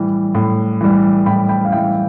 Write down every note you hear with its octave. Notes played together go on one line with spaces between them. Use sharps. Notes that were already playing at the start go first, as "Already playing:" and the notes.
Already playing: A2 E3 G3
A2
E3 G3
A2 G5 B5
G5 B5
F5
E3 G3 E5 G5